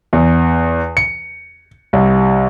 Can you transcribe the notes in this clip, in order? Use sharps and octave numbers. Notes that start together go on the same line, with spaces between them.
E2
C#7
C2